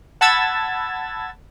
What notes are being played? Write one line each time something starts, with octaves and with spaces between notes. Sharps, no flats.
F#5 A5 B5 E6 G#6 A6